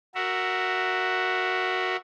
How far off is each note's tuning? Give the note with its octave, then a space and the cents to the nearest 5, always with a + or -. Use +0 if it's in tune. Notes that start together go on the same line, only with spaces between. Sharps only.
F#4 +0 A#4 +0 E5 +0